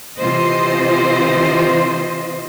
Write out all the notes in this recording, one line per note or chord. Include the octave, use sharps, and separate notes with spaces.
C3 E3 F4 C5 D#5